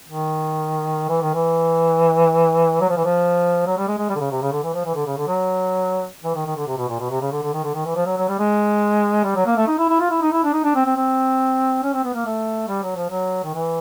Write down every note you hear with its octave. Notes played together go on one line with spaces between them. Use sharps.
D#3
E3
D#3
E3
F#3
F3
E3
F3
F#3
G3
G#3
G#3
G3
D3
C#3
C3
C#3
D3
E3
F3
E3
D3
C#3
D3
F#3
E3
D#3
D#3
D3
C3
B2
A#2
B2
C3
C#3
D3
D3
D#3
D3
D#3
E3
F3
F#3
F#3
G3
G#3
G3
F#3
A#3
A3
D#4
E4
E4
F4
E4
D#4
E4
D4
D#4
D4
C4
C4
C4
C#4
C4
B3
A#3
A3
G3
F#3
F3
F#3
D#3
E3